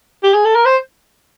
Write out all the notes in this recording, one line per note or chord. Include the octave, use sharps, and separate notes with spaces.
G4
G#4
A4
A#4
C5